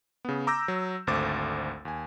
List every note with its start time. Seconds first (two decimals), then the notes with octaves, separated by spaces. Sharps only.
0.25 C#3 B3
0.47 A#5 D6 E6 G6 A#6
0.68 F#3
1.07 G#1 D2 A3 C5 D6 A6
1.85 D#2 G#5